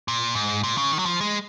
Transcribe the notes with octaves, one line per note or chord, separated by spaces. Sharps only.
A#2
G#2
A#2
C#3
D#3
F#3
F3
G#3